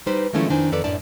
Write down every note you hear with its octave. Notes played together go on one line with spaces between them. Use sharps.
G3 D#4 G4 B4 C5
D#3 F3 G#3 A3 C#4 E4
F2 D#3 D4 C5 G#5
F2 D#3 A4 B4 D5
F#2 A2 D4 D5 A5